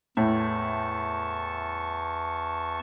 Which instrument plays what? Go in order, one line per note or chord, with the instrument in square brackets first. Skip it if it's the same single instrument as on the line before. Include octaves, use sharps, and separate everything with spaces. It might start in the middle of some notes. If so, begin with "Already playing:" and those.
[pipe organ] E2 A5 C#6 [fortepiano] A2